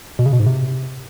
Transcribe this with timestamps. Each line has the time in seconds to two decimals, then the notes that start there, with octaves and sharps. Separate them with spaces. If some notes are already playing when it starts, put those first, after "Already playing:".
0.19 B2
0.26 C#3
0.33 B2
0.39 G#2
0.46 C3